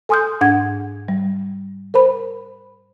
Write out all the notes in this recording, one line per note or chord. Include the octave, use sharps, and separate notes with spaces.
A4 G#5 C6 D#6 F6 G6
G#2 D4 F#5 G#6
G3
A#4 C5 B5